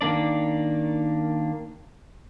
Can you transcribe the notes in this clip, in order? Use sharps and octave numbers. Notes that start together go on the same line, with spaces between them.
D#3 A#3 D4 D5